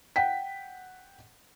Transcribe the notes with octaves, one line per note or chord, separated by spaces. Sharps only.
F#5 G5 B6